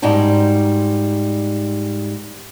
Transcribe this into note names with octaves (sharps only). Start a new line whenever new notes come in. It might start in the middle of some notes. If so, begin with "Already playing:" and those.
G#2 G3 D#4 F#4 A5